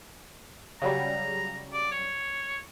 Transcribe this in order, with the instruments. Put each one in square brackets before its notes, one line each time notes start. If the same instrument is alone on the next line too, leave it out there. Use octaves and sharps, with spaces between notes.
[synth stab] C#3 F#3 G3 [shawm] A#5
[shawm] D5
C#5